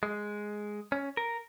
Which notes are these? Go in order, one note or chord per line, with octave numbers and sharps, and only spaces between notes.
G#3
C#4
A#4